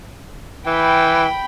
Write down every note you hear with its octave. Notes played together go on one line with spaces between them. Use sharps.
E3 G5 B5